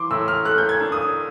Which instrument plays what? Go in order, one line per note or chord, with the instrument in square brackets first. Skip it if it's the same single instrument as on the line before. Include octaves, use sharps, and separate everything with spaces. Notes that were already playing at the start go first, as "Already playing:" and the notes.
Already playing: [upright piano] E3 C6 D6
A2 E6
F6
A3 F#6
G6
G#6
D4
D#6